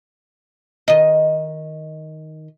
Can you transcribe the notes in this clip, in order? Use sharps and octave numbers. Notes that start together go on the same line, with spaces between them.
D#3 D#5